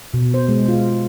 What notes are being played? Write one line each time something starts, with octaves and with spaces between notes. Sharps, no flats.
B2
C5
G#3
F4